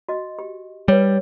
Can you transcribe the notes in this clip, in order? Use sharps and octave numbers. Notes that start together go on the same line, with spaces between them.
F#4 D#5
G4
G3 B4 C#5